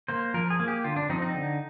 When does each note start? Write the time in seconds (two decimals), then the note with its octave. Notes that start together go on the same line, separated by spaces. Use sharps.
0.08 A#3 C5
0.34 F3 A#4
0.50 G#4
0.60 A#3
0.68 G4
0.84 D3 F4
0.96 D4
1.10 F3 C4 D#4
1.22 D#4
1.34 D3